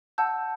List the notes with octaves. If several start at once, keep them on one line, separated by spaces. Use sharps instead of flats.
F#5 A5 E6 G6